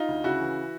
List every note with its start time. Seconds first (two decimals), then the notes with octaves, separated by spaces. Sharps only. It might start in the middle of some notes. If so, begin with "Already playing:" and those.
Already playing: D#4 F4
0.08 D2
0.24 C#3 E4 F#4
0.40 E3